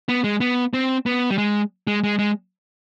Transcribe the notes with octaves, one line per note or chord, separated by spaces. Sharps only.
B3
G#3
B3
C4
B3
G3
G#3
G#3
G#3
G#3